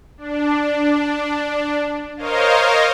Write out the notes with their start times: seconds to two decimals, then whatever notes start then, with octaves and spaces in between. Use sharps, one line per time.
0.18 D4
2.17 A#4 C5 C#5 D#5 F5